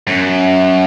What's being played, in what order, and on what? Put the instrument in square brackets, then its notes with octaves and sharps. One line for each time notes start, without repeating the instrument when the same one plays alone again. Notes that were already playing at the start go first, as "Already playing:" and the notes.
[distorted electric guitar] F#2